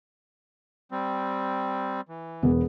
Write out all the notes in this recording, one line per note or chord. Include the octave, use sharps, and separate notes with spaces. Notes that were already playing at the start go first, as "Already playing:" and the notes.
G3 C4
E3
E1 B3